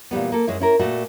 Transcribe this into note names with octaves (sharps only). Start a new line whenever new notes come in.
A#2 E3 G3 B3
A#3 A4
F#2 G#3 C#4 E4
C#4 E4 A#4
A#2 A3 F#4